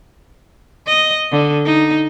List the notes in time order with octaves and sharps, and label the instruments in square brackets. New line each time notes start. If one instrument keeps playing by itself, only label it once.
[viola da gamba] D#5
D3
D#4